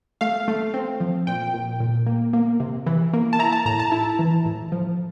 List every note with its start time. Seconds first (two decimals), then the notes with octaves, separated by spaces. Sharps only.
0.21 A3 F5
0.48 A3
0.74 C4
1.00 F3
1.27 A#2 G5
1.54 A#2
1.80 A#2
2.06 A#3
2.33 A#3
2.60 C3
2.86 E3
3.13 A#3
3.33 A5
3.39 E4 A#5
3.52 A5
3.65 A2 A#5
3.79 A5
3.92 E4
4.19 E3
4.45 A2
4.72 F3